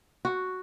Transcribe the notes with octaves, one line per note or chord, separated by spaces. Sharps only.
F#4